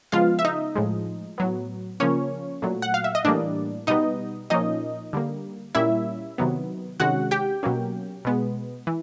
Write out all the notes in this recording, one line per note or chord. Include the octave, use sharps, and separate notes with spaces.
C#3 F3 G#3 B3 F4 F5
E5
D#4 D#5
A2 F3 G#3
A2 F#3 B3
C#3 F3 A#3 C#4 C#5
A#2 F#3 A3
F#5
F5
E5
D#5
A2 E3 G3 A#3 D4 D5
B2 G3 B3 D#4 D#5
A#2 F3 A#3 C#4 D#4 D#5
D3 G3 A#3
A#2 G3 A#3 C#4 E4 E5
C3 D#3 F#3 B3
C3 D#3 G#3 C#4 F#4 F#5
G4 G5
B2 F#3 A#3 C#4
B2 G#3 B3
E3